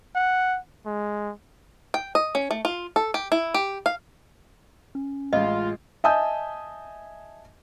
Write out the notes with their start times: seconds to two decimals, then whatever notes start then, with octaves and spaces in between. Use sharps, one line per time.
0.16 F#5
0.86 G#3
1.94 G5
2.15 D#5
2.35 C#4
2.51 A3
2.65 F4
2.96 A4
3.14 G4
3.32 E4
3.54 G4
3.86 F5
4.95 C#4
5.33 A1 G#3 F4 D#5
6.04 D#5 E5 G#5 A5 D#6 G6